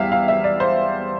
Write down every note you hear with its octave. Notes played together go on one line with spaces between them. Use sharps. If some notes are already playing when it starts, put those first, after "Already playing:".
Already playing: E2 E3 G3 E5 F5 G5
F5
E5
D5
C5